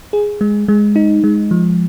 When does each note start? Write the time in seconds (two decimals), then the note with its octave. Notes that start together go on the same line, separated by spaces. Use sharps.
0.13 G#4
0.41 G#3
0.68 G#3
0.96 D#4
1.24 G#3
1.51 F3